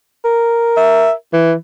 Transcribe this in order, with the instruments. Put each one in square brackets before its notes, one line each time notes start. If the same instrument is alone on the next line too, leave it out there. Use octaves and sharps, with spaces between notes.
[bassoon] A#4
[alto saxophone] E5
E3